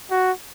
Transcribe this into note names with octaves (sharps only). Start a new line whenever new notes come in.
F#4